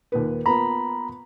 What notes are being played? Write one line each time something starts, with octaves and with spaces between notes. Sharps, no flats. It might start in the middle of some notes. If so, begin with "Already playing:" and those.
D#2 A#2 B4
A#3 B3 F4 A#5 B5